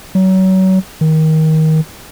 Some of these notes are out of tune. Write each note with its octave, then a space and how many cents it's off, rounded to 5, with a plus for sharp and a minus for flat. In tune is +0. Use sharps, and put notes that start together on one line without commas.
F#3 +30
D#3 +20